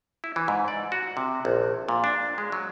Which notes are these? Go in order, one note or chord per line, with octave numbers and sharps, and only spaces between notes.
E4
E3
G#2
D5
F#4
C3
A#1
A#2
D4
G#3
F#3